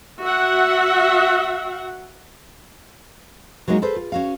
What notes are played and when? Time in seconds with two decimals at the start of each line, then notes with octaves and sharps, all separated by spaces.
0.21 F#4 E5 F#5
3.68 F#3 G#3 A#3 D#4 F#4
3.82 G#4 A4 B4 C5
3.96 F4
4.12 C#4 F#4 F5